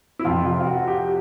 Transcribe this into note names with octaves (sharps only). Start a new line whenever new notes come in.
E4
F2 C3 F3 F4
F4
F4
F#4
G4